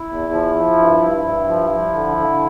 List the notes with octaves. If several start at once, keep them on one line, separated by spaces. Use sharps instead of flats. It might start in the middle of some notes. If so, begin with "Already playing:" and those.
Already playing: E4
E2
F3
F3
G2
G2
G2
F3
F3
D3
D3